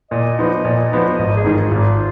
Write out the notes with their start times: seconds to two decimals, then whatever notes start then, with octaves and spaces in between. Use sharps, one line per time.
0.11 A#2 D#5
0.39 F3 B3 D#4
0.65 A#2
0.92 F3 B3 D#4
1.18 G#1 D#5
1.37 G#4
1.44 G#2 D#3
1.54 F4
1.71 G#1 F4